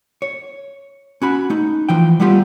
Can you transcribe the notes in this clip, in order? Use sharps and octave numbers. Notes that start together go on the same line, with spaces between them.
C#5
C#4 F#4 B5
A3 D#4
E3 F3 G5
G3 A3 B3 F4 G4